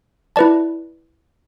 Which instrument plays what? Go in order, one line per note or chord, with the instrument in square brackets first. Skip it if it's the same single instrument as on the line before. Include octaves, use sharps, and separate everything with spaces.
[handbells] E4 B4 D5 A5